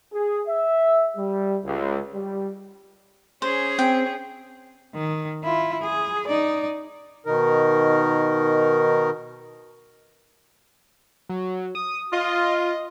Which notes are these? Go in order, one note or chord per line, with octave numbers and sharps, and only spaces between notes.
G#4
E5
G3
C#2
G3
C#4 G#4 C5
C4 G5
D#3
E4 F4
G#4
D#4 D5
B2 D#3 D#4 A#4
F#3
D#6
F4 D#5